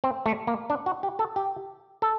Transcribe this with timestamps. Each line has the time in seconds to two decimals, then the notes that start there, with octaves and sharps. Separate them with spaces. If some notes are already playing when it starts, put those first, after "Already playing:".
0.04 C4
0.26 A3
0.47 A#3
0.70 D4
0.86 F#4
1.03 G4
1.19 A4
1.36 G4
2.02 A4